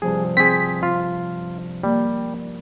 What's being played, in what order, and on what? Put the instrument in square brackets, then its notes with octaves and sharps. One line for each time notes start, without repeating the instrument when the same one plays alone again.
[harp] G2 C3 F3 [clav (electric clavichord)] G#4
[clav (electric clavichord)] C4 G#4 [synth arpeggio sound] B6
[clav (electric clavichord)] F4
[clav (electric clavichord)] G3 [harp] A#3